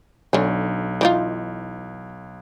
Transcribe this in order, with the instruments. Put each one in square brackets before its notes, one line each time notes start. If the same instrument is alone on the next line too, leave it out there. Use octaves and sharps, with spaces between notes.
[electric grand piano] B1 [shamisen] D3 C#4
[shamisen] E3 D#4 F4